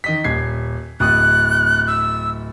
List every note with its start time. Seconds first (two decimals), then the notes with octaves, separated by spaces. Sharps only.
0.04 D#3 D#5 B6
0.24 D#1 G#6 C7
1.00 D1 D#6 F#6
1.87 E6